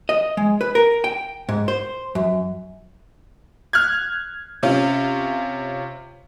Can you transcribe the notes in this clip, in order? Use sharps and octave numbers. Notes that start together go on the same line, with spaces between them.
D#5
G#3
B4
A#4
G5
G#2
C5
F#2
F6 F#6 G#6
C3 C#4 F4